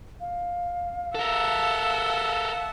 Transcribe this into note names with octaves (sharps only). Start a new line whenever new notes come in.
F5
A4 A#4 E5 F#5 A5